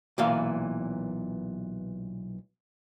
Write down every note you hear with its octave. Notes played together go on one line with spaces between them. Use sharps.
B1 A#2 E3 F5